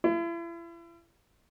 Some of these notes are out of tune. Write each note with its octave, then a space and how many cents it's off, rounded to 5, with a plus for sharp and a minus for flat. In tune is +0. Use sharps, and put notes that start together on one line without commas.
E4 +40